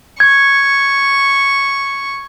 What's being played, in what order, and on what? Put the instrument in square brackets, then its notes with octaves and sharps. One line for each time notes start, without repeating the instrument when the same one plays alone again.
[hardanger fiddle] C#6 [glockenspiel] G#6